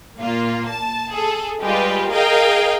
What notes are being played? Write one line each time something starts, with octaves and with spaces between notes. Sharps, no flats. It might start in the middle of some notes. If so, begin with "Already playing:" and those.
A#2 A#3 F4
A5
G#4 A4
G3 G#3 F4 G4 B4
G#4 A#4 D#5 F5 G5